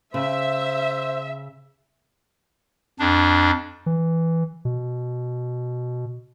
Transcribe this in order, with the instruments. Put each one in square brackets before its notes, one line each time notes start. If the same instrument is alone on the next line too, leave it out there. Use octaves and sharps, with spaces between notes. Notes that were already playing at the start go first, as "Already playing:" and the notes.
[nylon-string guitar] C#3 [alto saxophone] C5 [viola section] E5
[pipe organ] F2 D4
[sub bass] E3
B2